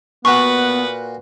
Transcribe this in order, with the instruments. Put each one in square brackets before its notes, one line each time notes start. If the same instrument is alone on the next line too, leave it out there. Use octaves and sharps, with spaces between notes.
[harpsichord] A#2 F#4 [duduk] B3 [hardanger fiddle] B4 F#5 [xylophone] C#6